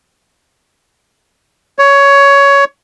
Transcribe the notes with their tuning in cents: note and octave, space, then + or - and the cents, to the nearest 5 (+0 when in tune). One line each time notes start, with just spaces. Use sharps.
C#5 +15